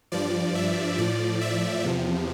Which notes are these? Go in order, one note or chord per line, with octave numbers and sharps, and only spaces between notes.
G2 F3 D5
E5
A2 F3 D5
E5
E2 C3 F3